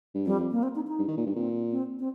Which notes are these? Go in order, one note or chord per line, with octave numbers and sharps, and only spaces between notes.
G2
F2 G3
A#3
C4
D#4
D#4
G2
D#3
A#2
G2
A#2 C4
C4
C4